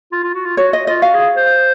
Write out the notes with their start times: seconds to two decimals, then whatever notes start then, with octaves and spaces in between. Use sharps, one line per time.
0.12 F4
0.23 F4
0.34 F#4
0.45 F4
0.57 F#4 C#5
0.73 D#5
0.87 F4 D#5
1.02 F#4 F5
1.15 G#4
1.36 C5